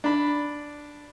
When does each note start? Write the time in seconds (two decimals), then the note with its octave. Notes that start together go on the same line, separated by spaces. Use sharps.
0.04 D4 B5